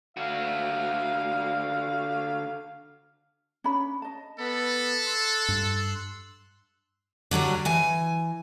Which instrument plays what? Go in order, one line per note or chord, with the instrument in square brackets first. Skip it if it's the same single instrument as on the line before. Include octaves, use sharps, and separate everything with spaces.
[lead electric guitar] D3 F#4 [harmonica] F5
[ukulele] C#4 D4 B5
D#5 A5
[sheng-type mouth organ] B3 B5 [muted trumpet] A4
[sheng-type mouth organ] C6 E6 F#6
[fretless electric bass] G2
[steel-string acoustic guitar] D3 F#3 G3 D4
E3 G#5